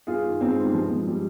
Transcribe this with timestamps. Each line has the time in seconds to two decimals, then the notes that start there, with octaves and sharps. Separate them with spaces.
0.07 G2 F4 G#4
0.24 D#3
0.41 G2 G#3 C4
0.57 D#3
0.64 G3
0.74 G2 F3 G#3
0.90 F3
1.07 G3